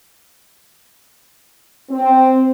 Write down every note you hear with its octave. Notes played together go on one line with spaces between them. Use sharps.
C4